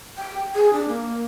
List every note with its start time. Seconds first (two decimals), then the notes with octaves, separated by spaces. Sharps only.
0.17 G5
0.55 G#4
0.73 D4
0.88 A#3